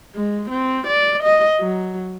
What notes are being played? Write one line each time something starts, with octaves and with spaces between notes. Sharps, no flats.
G#3
C4
D5
D#5
F#3